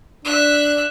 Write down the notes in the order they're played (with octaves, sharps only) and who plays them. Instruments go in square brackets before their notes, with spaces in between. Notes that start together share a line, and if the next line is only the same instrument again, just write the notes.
[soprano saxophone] D4 [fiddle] E5 F#6